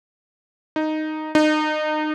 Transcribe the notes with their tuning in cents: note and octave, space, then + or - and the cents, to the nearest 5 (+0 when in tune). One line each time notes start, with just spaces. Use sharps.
D#4 -5
D#4 -30